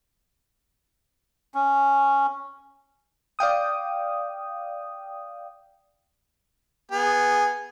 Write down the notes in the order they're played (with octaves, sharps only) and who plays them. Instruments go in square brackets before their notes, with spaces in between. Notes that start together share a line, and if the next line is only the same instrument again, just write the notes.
[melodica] C#4
[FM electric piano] D5 F5 G5 D#6
[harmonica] B3 G#4